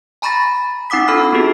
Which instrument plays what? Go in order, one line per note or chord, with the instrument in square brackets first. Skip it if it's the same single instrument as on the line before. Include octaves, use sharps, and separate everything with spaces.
[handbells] G#5 A#5 B5 C#6 A6 A#6
C4 D#4 F#5 D6 D#6 B6
D4 F4 A4 B5 F6
B3 D#4 F4 F#4 G#4